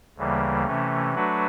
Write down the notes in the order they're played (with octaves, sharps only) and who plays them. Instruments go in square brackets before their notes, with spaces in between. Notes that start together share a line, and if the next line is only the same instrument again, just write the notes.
[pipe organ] D2 C#3 E3 G3 A#3
C3 E3 A3 C#4
F#3 A3 D4 F#4 B4